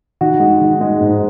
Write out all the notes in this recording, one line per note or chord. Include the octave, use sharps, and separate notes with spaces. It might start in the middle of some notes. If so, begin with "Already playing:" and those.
D#3 F#4
G#3
D#3
G#3
G#2